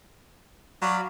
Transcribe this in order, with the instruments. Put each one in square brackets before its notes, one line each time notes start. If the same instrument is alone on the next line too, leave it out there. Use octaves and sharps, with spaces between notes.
[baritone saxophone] F#3 [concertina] D5 F5 B5